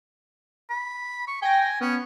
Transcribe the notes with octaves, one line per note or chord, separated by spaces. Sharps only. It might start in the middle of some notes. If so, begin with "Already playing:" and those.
B5
C#6
G5 G#5 A#6
B3 C#4